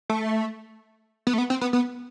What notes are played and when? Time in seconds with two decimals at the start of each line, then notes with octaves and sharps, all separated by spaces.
0.10 A3
1.27 B3
1.34 A3
1.38 B3
1.50 C4
1.61 B3
1.73 B3